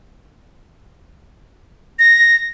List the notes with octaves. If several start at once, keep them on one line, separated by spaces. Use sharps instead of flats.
A#6